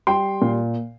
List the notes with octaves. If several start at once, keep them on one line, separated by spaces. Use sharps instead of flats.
G3 G5 C6
A#2